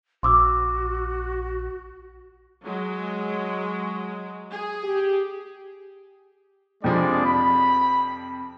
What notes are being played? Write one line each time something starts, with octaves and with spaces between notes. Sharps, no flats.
A#1 F#4 C6 D6 E6
F#3 G#3
G#4
G4
F2 C3 F3 G#3 D4 D5
B5